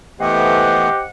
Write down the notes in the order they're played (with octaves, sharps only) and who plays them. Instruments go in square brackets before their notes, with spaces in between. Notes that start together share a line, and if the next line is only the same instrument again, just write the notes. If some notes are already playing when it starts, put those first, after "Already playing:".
[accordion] E3 A3 B3 [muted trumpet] G4 [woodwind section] C5 D#5 F#5